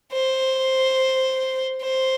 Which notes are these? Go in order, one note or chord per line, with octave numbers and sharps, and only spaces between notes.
C5
C5